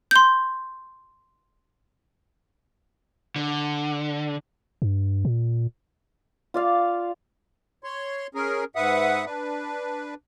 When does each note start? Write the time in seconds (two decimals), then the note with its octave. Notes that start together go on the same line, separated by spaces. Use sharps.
0.11 C6 G6
3.36 D3
4.82 G2
5.25 A#2
6.54 F4 D5 F5
7.84 C#5 C6
8.35 C#4 G#4 A#4
8.76 G#2 B4 E5 F#5 D#6
9.25 D4 B4